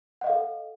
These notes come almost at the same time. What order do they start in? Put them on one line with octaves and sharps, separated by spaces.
F#5 D#5 F5 A4